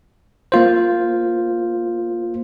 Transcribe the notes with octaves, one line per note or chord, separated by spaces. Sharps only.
A#3 F4 C5